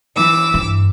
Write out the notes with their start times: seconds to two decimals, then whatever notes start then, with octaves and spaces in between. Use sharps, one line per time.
0.17 E3 D6 E6
0.54 G2